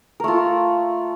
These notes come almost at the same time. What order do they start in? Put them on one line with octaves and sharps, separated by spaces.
A#4 A3 F4